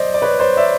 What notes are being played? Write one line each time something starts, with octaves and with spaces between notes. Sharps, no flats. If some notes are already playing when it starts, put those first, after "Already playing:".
Already playing: C5 D5 D#5
D5
B4 C#5
C5 D5
D5 E5